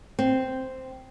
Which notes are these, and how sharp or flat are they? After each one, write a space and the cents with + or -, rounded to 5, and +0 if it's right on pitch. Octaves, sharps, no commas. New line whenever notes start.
C4 -5